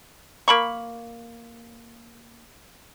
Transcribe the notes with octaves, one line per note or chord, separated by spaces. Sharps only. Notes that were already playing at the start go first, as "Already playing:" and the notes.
A#3 B5 C#6